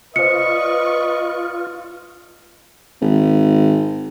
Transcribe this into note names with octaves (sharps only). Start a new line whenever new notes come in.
F4 B4 C5 D5 D#5 C#6 C#7
G#1